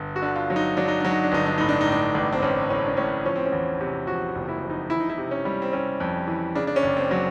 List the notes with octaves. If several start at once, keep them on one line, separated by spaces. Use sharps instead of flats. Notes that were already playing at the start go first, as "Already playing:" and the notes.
Already playing: G1
F#4
D3
F4
F#3
D#4
F#3 D4
D#4
F#3 D4
D#4
D4
G1 D#4
D4
A2 D#4
D4
D#4
A2
D4
A1
C4
A1 C#4
A2 C#4
D4
A2 C#4
F3 C#4
C4
C#4
E2
C3
F3 F#4
F#1
E4
F3
D#4
E3 E4
D#4
E4
C3
C#4
G3
C4
C3 C#4
F2
E3
C#3 D4
D4
C#4
F#1
C4
F#3